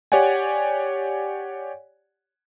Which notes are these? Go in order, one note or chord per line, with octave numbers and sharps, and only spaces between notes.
G4 C#5 D5 F#5 G#5